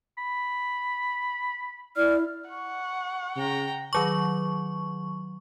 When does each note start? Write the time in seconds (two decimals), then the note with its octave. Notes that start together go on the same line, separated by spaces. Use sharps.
0.18 B5
1.97 E4 D5 F6
2.50 F#5 C#6
3.36 C#3 G5 A#5
3.93 D#3 F#3 C#6